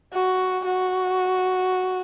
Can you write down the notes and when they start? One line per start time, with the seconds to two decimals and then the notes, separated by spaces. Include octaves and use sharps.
0.13 F#4
0.65 F#4